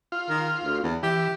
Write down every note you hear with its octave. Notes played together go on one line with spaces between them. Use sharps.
F4
D#3
D2
E2
E3 G4